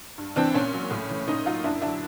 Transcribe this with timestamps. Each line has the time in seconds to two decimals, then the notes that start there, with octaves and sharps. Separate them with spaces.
0.18 G2
0.36 E3 C4 D4
0.54 A#2 C#4
0.73 F#3
0.91 A2
1.10 E3
1.27 A#2 C#4 D#4
1.45 F#3 D#4 F4
1.64 F#2 D4 E4
1.82 D3 F#3 D4 E4